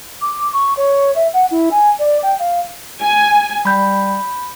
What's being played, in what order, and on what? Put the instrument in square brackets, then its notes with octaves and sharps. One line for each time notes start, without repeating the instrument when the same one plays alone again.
[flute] D6
C#6
C#5
E5
F#5
E4
G#5
D5
G5
F5
[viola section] G#5
[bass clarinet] G3 [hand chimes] B5 G6